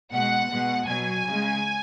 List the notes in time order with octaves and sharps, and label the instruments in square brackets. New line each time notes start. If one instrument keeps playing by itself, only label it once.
[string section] B2 G#3 F#5
B2 G#3
B2 F#3 G#5
C#3 G#3